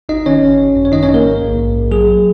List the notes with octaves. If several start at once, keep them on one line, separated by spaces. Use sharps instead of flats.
G#1 D#4 D#5
D#3 C#4 C#5
G#1
G#1
F#2
C#5
D#3 D#4 D#5
C#4 C#5
G#1
A#3 A#4
G#2
A#1
G#2
A#1
F#3 G#4
F#3